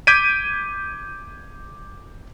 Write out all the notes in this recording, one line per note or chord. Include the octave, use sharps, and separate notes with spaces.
D6 G6 G#6 B6 D7 D#7